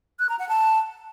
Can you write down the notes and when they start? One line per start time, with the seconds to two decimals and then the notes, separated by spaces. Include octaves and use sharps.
0.19 F#6
0.29 A#5
0.39 F#5
0.49 A5